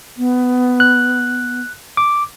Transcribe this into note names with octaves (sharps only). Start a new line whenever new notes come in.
B3
F#6
D6